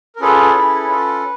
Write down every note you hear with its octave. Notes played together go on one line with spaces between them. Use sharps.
A#4
C#4 F4 G#4 A4 B4
C#4 E4 G#4
C#4 F4 A4